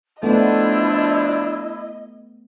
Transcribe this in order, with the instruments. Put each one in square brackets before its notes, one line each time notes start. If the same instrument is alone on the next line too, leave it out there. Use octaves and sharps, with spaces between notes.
[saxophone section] F3 D4 [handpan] A3 B3 [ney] E4 [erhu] D#5